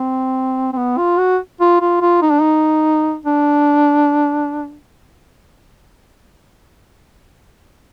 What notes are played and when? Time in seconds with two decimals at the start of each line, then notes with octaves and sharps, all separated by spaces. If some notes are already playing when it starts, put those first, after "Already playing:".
Already playing: C4
0.73 C4
0.77 B3
0.98 F4
1.19 F#4
1.60 F4
1.81 F4
2.01 F4
2.22 D#4
2.31 D4
2.41 D#4
3.26 D4